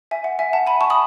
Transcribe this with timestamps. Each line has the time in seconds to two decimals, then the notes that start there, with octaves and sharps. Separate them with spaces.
0.11 E5 G#5
0.24 F#5
0.39 E5 G#5
0.53 F#5 A5
0.67 G#5 B5
0.81 A5 C#6
0.90 B5 D#6